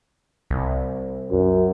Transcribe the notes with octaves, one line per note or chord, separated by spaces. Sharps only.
C2
F#2